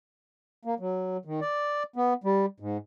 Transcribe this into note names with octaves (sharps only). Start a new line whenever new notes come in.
A#3
F#3
D#3
D5
B3
G3
G#2